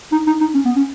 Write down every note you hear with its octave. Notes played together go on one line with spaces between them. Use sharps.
D#4
D#4
D#4
C#4
B3
C#4